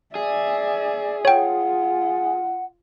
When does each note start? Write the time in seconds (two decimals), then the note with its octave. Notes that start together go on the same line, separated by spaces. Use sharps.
0.15 G#4 D5 E5
1.25 F4 C#5 F#5 G5